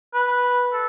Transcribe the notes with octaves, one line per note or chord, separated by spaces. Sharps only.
B4
A4